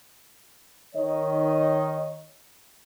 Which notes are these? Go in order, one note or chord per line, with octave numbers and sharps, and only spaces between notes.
D#3 C#5 D#5